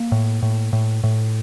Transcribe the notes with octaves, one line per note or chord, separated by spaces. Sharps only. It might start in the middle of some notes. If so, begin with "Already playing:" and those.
Already playing: A#3
A2
A2
A2
A2